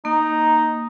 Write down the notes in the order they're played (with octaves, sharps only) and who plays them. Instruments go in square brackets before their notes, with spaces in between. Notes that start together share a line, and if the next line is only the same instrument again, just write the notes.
[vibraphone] A#3 [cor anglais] D#4